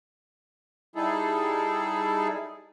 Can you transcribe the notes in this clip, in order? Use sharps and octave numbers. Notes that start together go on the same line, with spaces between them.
G3 D#4 E4 G#4 A4